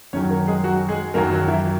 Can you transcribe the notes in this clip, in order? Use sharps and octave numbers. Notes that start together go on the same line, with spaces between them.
F#2 D#3 F#3 C#4 C#5
A#3 A#4
G#3 G#4
F#3 F#4
G#3 G#4
F#2 D#3 F#3 A#3 A#4
F#3 F#4
E3 E4